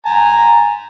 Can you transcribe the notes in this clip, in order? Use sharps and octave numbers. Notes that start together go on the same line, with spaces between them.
G#5 A#5